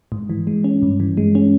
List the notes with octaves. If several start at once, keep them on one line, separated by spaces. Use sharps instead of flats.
G#2
E3
G#3
C#4
G2
E3
G#3
C#4